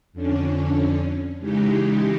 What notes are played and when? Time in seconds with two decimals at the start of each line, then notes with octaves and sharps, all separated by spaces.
0.13 F2 D3 C#4 D4
1.39 C#3 E3 G#3 D#4 G4